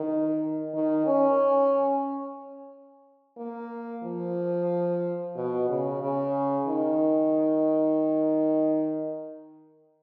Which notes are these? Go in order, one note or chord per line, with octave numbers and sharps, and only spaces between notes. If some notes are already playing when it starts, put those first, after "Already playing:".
Already playing: D#3
D#3
C#4
A#3
F3
B2
C#3
C#3
D#3